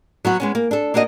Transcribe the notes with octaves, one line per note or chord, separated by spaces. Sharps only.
F#3 B3 F#4
G#3 B3 C#4
A#3
D4 A4
A#3 D4 F#4 A4 D#5